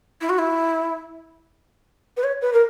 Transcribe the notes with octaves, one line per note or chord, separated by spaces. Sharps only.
E4
F#4
E4
B4
C#5
B4
A#4